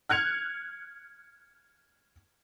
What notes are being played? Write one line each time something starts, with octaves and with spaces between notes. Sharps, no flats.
F6 F#6 G#6 C#7 F7